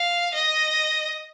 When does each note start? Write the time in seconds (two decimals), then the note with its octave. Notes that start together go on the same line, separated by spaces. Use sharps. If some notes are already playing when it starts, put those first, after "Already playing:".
Already playing: F5
0.34 D#5